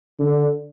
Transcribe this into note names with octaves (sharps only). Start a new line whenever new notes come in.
D3